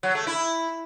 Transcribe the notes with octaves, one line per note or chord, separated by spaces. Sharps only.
F#3
A3
E4